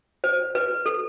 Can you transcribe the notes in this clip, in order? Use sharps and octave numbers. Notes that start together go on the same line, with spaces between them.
C5
B4
A4